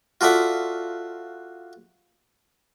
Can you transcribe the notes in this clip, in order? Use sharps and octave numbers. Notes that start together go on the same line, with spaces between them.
F4 F#4 A4 D5 E5 F#5